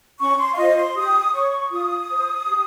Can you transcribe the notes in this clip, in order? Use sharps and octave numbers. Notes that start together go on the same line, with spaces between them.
C#4 C#6
C6
F5
F4 C5 D#5
C6
G4 D#6
C#5 C#6
F4 D#6
C5
G4